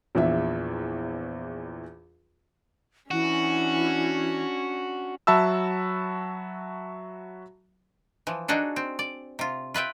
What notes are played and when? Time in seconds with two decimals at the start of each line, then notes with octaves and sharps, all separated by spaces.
0.15 A#1 E2 E5
3.11 E3 C#4 D4 F#4
5.27 F#3 F#4 E5 A5 B5 E6
8.27 E3 F3
8.48 D4 D#4 F#4 G#4 A4
8.76 C4
8.99 D5
9.39 C3 F4
9.74 F4 B4 E5 G5